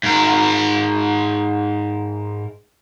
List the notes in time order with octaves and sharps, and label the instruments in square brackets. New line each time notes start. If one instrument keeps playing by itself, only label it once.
[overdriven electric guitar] G#2 A#4